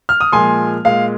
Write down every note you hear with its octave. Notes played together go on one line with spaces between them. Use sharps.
F6
D#6
A#2 F3 G#3 G#5 C6
A#2 G#3 F5